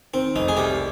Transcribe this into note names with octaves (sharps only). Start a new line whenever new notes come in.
D#3 C4
F1 D#4
G#4
C2 G4